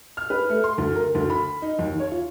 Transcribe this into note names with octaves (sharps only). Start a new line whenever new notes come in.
F6
B4
A3
C6
D2
A#4
D2
B5
D#4
D#2
C#5
F4